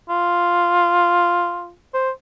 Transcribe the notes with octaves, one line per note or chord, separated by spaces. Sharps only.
F4
C5